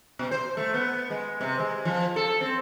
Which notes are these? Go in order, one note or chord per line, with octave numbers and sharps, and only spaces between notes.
B2
C5
A3
B3
G#3
C3
G#3
F3
A4
C4